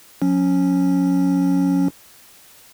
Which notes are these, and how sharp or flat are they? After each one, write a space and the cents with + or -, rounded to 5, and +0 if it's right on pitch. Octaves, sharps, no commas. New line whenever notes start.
F#3 -45 C#4 +0